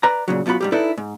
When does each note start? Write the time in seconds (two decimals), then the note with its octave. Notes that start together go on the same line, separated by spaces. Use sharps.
0.03 B4 D5 A#5
0.28 A#2 C#3 F#3
0.46 F#2 B2 F4 F#4 B5
0.61 G#2 G3 G4
0.72 D#4 E4 A4 B4 D5
0.98 G#2